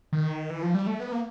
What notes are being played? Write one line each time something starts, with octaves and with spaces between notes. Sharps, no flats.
D#3
E3
F3
G3
A3
B3
A#3